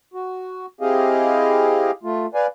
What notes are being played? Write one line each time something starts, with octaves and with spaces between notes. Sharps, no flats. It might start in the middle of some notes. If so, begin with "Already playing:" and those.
F#4
C4 E4 G4 G#4 D#5 F5
A3 F4
B4 D5 F5 G#5